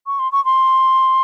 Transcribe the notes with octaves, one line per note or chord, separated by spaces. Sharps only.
C#6
C6
C#6
C6